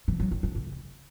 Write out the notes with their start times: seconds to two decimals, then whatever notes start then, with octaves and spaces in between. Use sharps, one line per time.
0.08 E3
0.20 F#3
0.31 D#3
0.43 D4
0.55 C#3